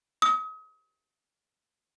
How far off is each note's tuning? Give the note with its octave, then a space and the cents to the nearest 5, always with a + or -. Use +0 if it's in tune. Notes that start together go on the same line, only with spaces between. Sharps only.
D#6 +35